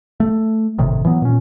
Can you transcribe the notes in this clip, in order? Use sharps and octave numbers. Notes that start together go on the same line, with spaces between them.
A3
G1 A2 C3 D#3
E3 F#3 B3
A#2 C#4